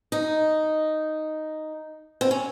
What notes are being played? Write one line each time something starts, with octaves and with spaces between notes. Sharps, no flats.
D#4
C4
C#4